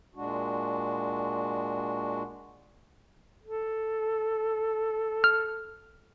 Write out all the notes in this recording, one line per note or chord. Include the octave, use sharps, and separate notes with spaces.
A#2 G#3 D4 F#4
A4
F6